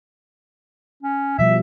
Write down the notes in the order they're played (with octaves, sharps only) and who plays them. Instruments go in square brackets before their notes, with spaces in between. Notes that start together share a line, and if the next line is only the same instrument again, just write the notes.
[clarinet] C#4
[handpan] B2 F3 G3 [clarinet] E5